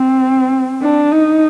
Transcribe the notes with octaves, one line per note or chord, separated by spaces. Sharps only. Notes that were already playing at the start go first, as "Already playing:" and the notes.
Already playing: C4
D4
D#4